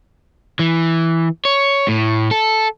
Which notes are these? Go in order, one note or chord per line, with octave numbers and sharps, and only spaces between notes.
E3
C#5
A2
A4